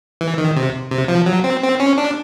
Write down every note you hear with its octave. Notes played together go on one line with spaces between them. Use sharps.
E3
D#3
C3
C3
F3
F#3
C4
C4
C#4
D4